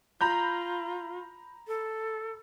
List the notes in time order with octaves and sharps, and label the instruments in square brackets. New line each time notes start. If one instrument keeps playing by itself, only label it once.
[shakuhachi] F4 [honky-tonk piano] A#5 B5 G6
[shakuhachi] A4